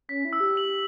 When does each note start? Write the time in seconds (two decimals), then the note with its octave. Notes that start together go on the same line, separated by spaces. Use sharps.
0.09 C#4 B6
0.25 E4
0.33 E6
0.40 G4
0.57 F#7